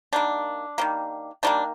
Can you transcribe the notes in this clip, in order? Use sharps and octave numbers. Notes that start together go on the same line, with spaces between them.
D#3 G3 A#3 D4
D#3 G3 A#3
D#3 G3 A#3 D4